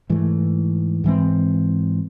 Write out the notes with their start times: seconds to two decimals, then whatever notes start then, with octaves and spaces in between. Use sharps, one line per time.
0.10 G#2 E3 A3
1.04 G#2 E3 G#3 C4